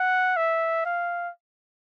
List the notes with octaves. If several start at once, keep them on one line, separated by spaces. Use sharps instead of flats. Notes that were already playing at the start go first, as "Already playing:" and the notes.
Already playing: F#5
E5
F5